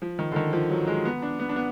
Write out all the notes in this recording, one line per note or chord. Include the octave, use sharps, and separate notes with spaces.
F3
D#3
D3
D#3
F3
F#3
G#3
B3
D4
B3
D4
B3